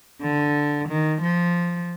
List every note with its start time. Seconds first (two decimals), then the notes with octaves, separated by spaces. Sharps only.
0.21 D3
0.89 D#3
1.21 F3